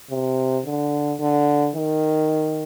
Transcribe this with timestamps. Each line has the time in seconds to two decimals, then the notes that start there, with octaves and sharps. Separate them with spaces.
0.10 C3
0.65 D3
1.20 D3
1.75 D#3